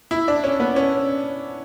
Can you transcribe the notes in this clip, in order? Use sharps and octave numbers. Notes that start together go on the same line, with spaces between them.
E4
D4
C#4
B3
C#4